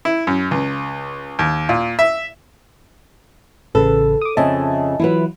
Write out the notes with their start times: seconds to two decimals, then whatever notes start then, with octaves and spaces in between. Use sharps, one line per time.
0.05 E4
0.27 F#2
0.51 C#2
1.39 D#2
1.69 A#2
1.99 E5
3.75 A1 C#3 A4 B4
4.22 D6 D#6
4.37 F2 C#3 D#5 E5 A5
5.00 E3 F#3 E4 F4 B4